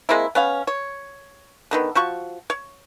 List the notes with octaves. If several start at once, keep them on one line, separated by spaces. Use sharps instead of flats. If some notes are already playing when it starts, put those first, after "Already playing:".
G#3 A#3 C4 E4
B3 C#4 F5
C#5
D3 D#3 B3
F3 F#4 C#6
C#5